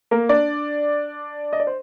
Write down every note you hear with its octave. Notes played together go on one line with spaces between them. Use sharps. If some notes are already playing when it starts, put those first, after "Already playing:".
A#3 A#4
D4 D5
D#5
D5
C5